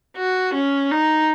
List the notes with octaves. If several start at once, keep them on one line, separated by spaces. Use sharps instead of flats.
F#4
C#4
D#4